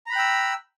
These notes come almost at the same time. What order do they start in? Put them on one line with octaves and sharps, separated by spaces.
A#5 B5 F#6 G5 E6